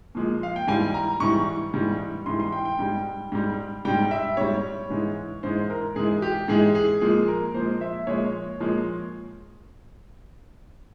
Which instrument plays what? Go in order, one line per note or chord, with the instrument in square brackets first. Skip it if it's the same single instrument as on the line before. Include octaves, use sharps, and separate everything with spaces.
[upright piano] A#2 F3 G#3
F5
G5
G#2 E3 G3 G#5
A#5
G#2 E3 G3 C#6
G#2 E3 G3
G#2 E3 G3 C6
C6
G5
G5
G#2 G3
G#2 G3
G#2 G3 G5
E5
G#2 G3 C#5
G#2 E3 G#3
G#2 E3 G#3 C5
A#4
G#2 E3 G#3 G#4
G4
G#2 E3 G#3 G#4
G#4
A#2 F3 G#3 G#4
A#4
A#2 F3 G#3 C5
E5
A#2 F3 G#3 C#5
A#2 F3 G#3